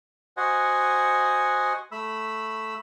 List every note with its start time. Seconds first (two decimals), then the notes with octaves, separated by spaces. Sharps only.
0.37 F#4 C5 D#5 F#5 G#5
1.92 A3 B5 E6